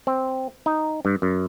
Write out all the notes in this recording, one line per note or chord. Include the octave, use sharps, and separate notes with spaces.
C4
D#4
G2
F#2